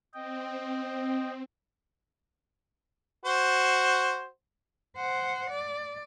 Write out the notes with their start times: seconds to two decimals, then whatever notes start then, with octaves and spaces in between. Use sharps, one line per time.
0.14 C4 D#5 G5
3.25 F#4 C5
4.96 C5 F#5
5.50 D5